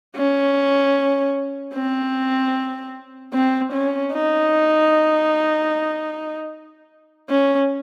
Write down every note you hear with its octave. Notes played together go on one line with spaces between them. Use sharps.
C#4
C4
C4
C#4
D#4
C#4